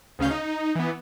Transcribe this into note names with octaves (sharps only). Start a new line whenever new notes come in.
D2 C#3 C#4 F5 G6
D#4
E3 B3